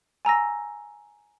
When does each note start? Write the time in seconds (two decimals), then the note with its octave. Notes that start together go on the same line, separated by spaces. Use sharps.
0.25 G#5 A#5 E6 A#6